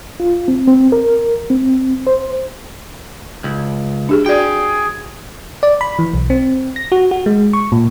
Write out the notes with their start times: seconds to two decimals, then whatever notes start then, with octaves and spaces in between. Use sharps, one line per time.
0.20 F4
0.48 C4
0.67 C4
0.92 A#4
1.50 C4
2.07 C5
3.44 C#2
4.09 D4 G4 G#4
4.26 F#4 G#4 D5 G5
5.63 D5
5.81 B5
5.99 E3
6.14 B1
6.30 C4
6.76 A#6
6.92 F#4
7.11 F#4
7.26 G#3
7.53 C#6
7.72 A#2